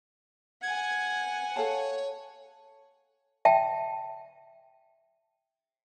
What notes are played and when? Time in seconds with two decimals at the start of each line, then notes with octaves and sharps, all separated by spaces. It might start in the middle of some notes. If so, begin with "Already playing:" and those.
0.63 F#5 G#5 G#6
1.56 A4 C#5 F5 A5
3.45 E5 G5 A5